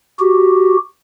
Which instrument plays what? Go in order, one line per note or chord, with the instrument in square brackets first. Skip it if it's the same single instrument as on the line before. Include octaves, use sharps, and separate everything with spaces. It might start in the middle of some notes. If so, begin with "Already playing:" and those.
[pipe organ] F#4 G4